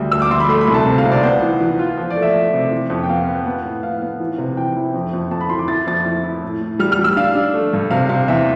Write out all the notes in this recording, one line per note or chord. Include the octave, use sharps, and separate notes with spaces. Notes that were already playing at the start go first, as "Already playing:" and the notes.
Already playing: D2 G3
D2 E6
D6
D2 C6
B5
A3 C6
B5
C2
A5
C3
F5
C3
D5
B3 C5
E3
E3
F4
F3
D5
A3
E5
F3
C3
E3
F2
G5
B3 F5
B3
B3
A2
A2 F5
B3
E3
C3
E3 G5
E4
F2
F2
F2 A5
B5
E3 C6
D6
E4 A6
F2 A6
E4
E4
A2
A2
G3 F6
F6
G3
E6
D4 F5
D4
A3
G2
C3 F5
C3 F5
E2 E5